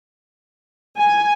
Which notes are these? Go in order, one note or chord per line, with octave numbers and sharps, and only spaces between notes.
G#5